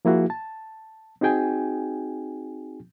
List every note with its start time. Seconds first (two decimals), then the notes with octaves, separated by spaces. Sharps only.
0.05 F3 A#3 E4 F#4 G#4
0.30 A5
1.21 C4 D#4 F#4 G#4 G5 G#5